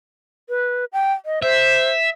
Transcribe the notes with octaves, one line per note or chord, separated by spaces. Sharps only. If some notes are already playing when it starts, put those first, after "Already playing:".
B4
G5
D#5
C5 E5